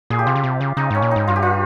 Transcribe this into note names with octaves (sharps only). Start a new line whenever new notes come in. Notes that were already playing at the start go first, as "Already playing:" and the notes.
A#2 G#4
G4
C3 F4
C#3
C3
C#3
C#3 D#4
G#2 C#4
A#2
G#2 D#4
G2 F4
G4
F4